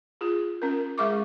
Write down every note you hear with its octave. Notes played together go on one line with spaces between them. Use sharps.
F4 G#4
C#4 A#4
G#3 G#4 E5 C#6 D6